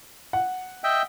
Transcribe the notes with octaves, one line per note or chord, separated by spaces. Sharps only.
F#5
D#5 E5 G5